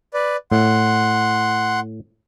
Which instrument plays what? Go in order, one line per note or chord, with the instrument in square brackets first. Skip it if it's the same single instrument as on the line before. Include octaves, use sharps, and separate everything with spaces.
[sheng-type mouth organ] B4 D5
[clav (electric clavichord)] A2 [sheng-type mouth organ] F#5 C6